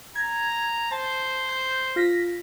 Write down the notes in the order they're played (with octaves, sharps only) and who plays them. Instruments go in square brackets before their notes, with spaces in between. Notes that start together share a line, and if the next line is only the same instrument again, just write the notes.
[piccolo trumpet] A#5 [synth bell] G#6
[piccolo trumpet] C5 [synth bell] A5
[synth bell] G6
F4 A#6 B6